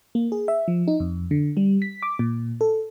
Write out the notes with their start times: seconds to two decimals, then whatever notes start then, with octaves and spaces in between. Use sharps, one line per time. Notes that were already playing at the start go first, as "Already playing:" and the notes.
0.15 A#3
0.32 G#4
0.48 E5
0.68 F3
0.88 D#4
1.00 F2
1.31 D3
1.57 G3
1.82 B6
2.03 D6
2.19 A#2
2.61 A4